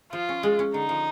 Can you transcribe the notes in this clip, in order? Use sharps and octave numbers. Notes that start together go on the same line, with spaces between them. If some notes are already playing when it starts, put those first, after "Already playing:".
F3 F4
C#4
G#3
C#4
D3 D#4
F3